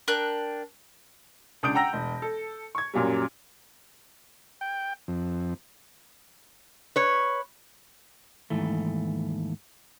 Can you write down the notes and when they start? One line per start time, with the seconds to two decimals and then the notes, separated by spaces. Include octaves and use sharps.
0.08 D4 A#4 G5 F#6
1.63 C#2 D4 D#6 G6 D7
1.75 F#5 G5 A#5 E6 A#6
1.93 E1
2.22 A4
2.75 C#6 G#6
2.94 F#2 A#2 F#3 G3
4.61 G5
5.08 F2
6.96 B4 C#5
8.50 D#2 G#2 E3 A3